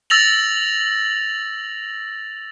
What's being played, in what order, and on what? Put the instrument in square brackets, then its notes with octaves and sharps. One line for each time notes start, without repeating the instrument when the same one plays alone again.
[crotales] E6 A6 A#6 F7 F#7